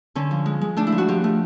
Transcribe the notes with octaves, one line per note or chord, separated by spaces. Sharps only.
D3 C#4
F3
G#3
G#3
A3 D4
E4
F3
F#4
F3 G4
A3